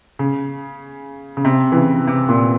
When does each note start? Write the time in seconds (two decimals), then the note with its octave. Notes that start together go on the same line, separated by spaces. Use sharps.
0.19 C#3
1.37 C#3
1.45 C3
1.72 E3
1.76 C#3
2.07 C3
2.29 A#2